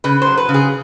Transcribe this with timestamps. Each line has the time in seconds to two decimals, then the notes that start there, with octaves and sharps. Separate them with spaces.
0.04 C#3 B4
0.22 C5
0.27 F#3
0.38 B4
0.49 C#3
0.54 G#4